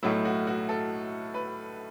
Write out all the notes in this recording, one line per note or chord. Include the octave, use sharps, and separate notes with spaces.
B1 A2 F#3 A3 E4
F#4
F#4
A4
B4